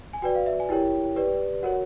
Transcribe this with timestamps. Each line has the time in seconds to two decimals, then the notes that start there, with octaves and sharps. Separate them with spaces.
0.13 G#5
0.22 F#4 B4 D5 G5
0.35 F5
0.46 E5
0.60 G#5
0.69 E4 G4 A#4 C#5 G5
1.16 G4 B4 D5
1.63 F#4 A#4 C#5 F#5